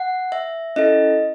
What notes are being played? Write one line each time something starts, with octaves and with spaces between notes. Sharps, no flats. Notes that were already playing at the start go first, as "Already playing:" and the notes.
Already playing: F#5
E5
C#4 E4 A4 D#5